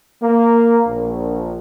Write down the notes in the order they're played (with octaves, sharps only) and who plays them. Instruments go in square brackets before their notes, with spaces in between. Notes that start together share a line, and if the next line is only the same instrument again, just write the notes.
[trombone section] A#3
A#1